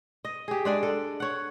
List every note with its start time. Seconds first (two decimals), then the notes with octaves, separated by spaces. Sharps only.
0.25 D#5
0.48 G4 G#4
0.65 G#3 D4 D5
0.83 A4
1.20 C#5 F#5